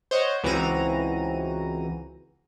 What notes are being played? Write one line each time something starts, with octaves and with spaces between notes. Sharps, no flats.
C5 C#5 D#5 F#5
C#2 E3 C4 F#4 A#5 D#7